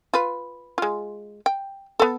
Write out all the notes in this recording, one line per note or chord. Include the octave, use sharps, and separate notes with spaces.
F4 B4
G#3 F4
G5
B3 A4